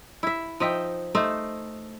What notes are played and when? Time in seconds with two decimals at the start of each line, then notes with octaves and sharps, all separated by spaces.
0.23 E4 E5
0.60 F3 D#4 E5 G5
1.15 A3 D#4 C5